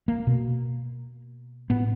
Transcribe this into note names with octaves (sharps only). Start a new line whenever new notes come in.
A#3
B2
A2 B3